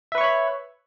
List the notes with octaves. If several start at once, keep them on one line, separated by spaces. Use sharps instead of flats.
B4 C#5 E5 B5 C#6